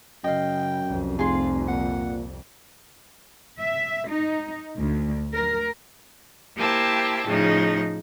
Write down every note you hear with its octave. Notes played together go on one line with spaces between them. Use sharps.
F#2 C#3 D#5 F5 G5
C2 F2
F1 F4 G#4 C6
A#2 F#5
E5
D#4
D2
A#4
A#3 E4 G4 C5 G5 A5
A2 C#3 F3 D#4